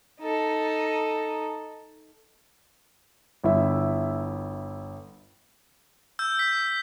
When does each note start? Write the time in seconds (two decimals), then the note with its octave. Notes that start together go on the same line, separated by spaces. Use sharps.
0.20 D#4 A4
3.44 G1 E4 E5
6.19 E6 G6
6.39 E6 B6